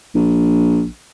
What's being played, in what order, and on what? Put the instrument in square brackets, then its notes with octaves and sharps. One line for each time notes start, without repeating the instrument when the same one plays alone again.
[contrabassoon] A#1